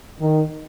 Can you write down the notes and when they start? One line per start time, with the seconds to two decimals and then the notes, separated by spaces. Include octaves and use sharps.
0.20 D#3